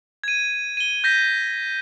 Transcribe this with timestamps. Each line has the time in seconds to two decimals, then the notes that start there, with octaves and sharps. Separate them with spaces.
0.24 G#6 D#7
0.77 D#7 G7
1.04 G6 A#6 B6